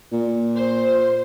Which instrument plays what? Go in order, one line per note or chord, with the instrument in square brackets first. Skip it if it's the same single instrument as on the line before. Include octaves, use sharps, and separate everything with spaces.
[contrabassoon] A#2
[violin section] C5